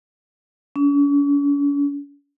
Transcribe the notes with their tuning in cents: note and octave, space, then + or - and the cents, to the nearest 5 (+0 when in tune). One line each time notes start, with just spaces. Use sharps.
C#4 +45